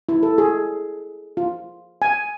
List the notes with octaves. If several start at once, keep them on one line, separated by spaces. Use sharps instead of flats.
E4
A4
G#4
F4
G#5